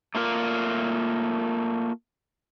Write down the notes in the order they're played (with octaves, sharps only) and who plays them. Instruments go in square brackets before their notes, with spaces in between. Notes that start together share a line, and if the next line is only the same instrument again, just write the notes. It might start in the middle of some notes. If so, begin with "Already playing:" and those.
[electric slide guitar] A3 A#3 F4 A#4